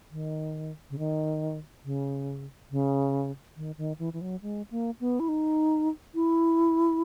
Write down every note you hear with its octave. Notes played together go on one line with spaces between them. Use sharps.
D#3
C#3
D#3
C#3
C#3
D#3
D#3
E3
E3
F#3
G#3
A#3
B3
E4
D#4
E4